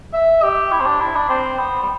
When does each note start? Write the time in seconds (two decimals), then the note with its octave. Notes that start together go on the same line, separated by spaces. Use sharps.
0.13 E5
0.42 G4
0.72 E4
0.80 C4
0.86 D4
1.00 E4
1.15 D4
1.29 C4
1.59 B3
1.82 G3